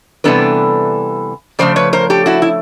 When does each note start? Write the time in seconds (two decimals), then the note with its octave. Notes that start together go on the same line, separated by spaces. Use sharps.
0.24 C3 E3 G3 B3 D4 A4 B4
1.59 C#3 F3 A3 C5 D5
1.76 B4 C#5
1.93 A#4 C5
2.10 G4 A4
2.26 E4 F#4
2.42 E4